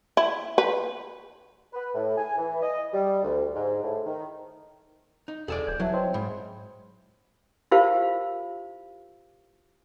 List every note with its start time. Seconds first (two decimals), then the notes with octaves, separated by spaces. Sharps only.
0.17 E4
0.58 B4
1.73 B4
1.95 A2
2.16 G#5
2.37 E3
2.62 D#5
2.93 G3
3.23 D2
3.55 G#2
3.83 A2
4.05 D#3
5.28 D#4
5.48 E1 G#4 A4 D5
5.67 D#1 G6 G#6
5.80 E3 F#3 C#5 E5 A5
5.94 C4 C#5 D#5 C6
6.14 G#2 B5
7.71 E4 F4 G4 A#4 C5 F5